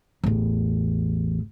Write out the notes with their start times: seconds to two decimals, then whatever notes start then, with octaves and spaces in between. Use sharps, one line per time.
0.24 A1 E2